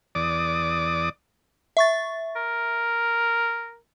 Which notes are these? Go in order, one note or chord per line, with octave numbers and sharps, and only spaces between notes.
E2 D5 D6 D#6
E5 C#6 A6
A#4